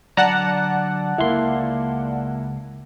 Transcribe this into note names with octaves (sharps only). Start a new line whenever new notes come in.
D3 F#3 D5 F#5 A5 A#5
C#2 A#3 E4 C6